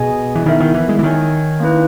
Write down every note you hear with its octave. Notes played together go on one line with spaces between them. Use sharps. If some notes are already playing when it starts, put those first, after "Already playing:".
Already playing: B2 G#4 D#5 G#5
E3
D#3 B3 E4 A#4 E5
D#3
E3
G#3
E3
D#3 D#4 A#4 C#5 G#5
A#3 C#4 E4 B4